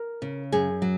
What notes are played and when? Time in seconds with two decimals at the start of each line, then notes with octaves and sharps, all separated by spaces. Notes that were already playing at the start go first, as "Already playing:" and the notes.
Already playing: A#4
0.22 C#3
0.52 F#2 G#4
0.82 F#3